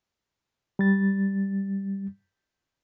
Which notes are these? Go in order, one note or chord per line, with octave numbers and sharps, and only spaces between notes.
G3 A6